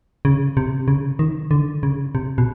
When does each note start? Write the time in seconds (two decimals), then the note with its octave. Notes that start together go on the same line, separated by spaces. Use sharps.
0.25 C#3
0.57 C3
0.88 C#3
1.19 D#3
1.51 D3
1.83 C#3
2.15 C3
2.38 B2